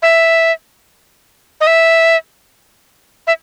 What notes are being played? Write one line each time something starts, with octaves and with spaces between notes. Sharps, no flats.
E5
D#5
E5
E5